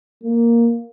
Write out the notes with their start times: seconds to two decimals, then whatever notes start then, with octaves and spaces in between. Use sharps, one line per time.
0.23 A#3